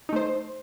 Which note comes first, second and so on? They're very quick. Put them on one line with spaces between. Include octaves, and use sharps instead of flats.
D#4 A3 C5